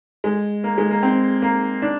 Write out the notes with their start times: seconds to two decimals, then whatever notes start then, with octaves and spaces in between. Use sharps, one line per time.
0.24 G#3
0.64 A#3
0.78 G#3
0.91 A#3
1.03 C4
1.42 A#3
1.82 D4